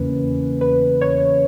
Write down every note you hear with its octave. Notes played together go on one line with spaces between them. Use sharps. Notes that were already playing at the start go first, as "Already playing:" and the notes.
Already playing: E2 C#3 E3 A#3 C#4 B4
B4
C#5